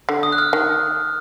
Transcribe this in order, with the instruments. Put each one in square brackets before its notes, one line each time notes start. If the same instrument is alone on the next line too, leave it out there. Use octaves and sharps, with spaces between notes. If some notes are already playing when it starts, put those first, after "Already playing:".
[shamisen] D3
[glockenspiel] D#6
F#6
F6
[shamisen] D#3